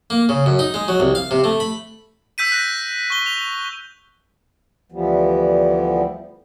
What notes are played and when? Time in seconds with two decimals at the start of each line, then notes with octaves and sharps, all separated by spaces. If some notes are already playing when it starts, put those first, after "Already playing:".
0.10 A#3
0.29 C#3
0.46 F#2
0.59 D#4
0.74 G#3
0.88 F#3
1.00 C2
1.15 F5
1.31 C3
1.44 A3
1.60 B5
2.38 E6 G6 B6 D#7
2.52 F#6 A#6
3.10 C#6 G7
3.26 F7
4.92 D2 E3 F3 G3 B3